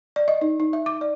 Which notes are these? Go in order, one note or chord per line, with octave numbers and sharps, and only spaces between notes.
D5
D#5
D#4
D#4
E5
D6
D5